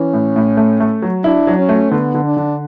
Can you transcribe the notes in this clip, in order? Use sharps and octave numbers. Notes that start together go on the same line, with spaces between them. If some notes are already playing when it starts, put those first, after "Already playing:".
Already playing: E3 C#4
A2
A2
A3
A3
F#3
D4 E4
F#3
C#4
A3
D3 B3
D3
D4
D3